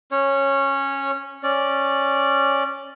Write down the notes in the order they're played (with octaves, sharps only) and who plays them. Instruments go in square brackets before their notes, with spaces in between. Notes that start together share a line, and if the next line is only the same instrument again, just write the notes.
[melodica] C#4 C#5
C#4 D5